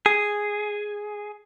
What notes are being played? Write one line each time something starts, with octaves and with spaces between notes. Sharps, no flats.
G#4